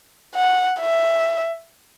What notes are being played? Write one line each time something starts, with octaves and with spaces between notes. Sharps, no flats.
F#5
E5